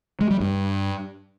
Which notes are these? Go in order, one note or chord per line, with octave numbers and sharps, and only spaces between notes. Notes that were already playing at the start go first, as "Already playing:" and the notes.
G#3
G3
G2